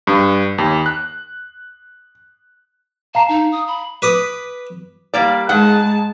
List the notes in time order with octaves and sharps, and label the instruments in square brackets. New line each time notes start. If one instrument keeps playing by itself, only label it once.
[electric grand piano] G2
D#2
F#6
[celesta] F5 A#5 C7 [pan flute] A5
[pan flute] D#4
D#6
B5
[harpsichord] B4 D6 D#6
[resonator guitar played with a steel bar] G3 A#3 D5
[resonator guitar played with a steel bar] G#2 F#5 [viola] G#3 A5